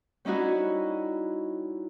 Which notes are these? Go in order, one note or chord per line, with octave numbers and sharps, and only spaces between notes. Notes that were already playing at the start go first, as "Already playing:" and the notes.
G3 C#4 D#4 E4 F#4